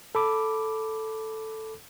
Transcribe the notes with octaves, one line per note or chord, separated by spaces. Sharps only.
A4 B5 D6